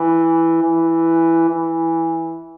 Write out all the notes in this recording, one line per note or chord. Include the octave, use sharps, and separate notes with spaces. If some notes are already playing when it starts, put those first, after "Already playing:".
Already playing: E3
E3
E3